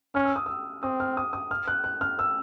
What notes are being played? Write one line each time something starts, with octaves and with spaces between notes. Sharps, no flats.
C#4 F6
E6
D#6
E6
C4 D#6
F6
D#6
D#6
F6
F#6
F#6
F6
E6